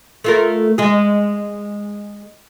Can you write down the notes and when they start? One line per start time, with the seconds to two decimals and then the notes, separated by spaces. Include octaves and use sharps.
0.24 A3 F4 A#4
0.78 G#3 G#4